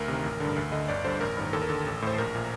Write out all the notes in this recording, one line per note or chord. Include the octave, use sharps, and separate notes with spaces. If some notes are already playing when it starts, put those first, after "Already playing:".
Already playing: D2 A#4
C3 D#3
A1
G2 D3
D2
D3 D#5
G1 D5
G2 D3 C5
A1 A#4
G2 D#3
D#2 A4
A#4
D3 A4
A1
A2 C5
A#1 A#4
A#2